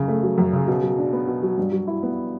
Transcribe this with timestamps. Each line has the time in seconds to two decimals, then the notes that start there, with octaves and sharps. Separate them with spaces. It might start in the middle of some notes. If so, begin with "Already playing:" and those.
Already playing: F#2 C#3
0.08 A3
0.23 F#3
0.38 F#2
0.53 C#3
0.67 B2
0.82 F#3
0.98 D4
1.13 B3
1.28 B2
1.43 F#3
1.57 G2
1.72 F#3
1.87 E4
2.03 B3